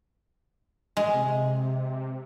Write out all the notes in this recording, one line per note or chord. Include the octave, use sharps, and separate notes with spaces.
G#3
C3